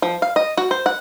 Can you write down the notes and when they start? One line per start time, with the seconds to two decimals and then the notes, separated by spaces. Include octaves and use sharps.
0.02 F3
0.22 F5
0.36 D#5
0.57 F#4
0.71 C5
0.86 F#5